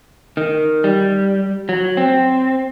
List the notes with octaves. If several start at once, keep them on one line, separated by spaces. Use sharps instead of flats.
D#3
G3
F#3
C4